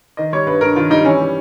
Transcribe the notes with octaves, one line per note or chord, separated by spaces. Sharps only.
D#3 D#5
G3 C#5
G2 B4
G2 A#4
D#3 F4
G3 D#4
E3 C#4
G3